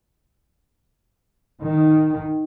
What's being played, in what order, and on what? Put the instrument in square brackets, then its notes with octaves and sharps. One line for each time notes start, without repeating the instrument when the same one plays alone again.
[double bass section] D#3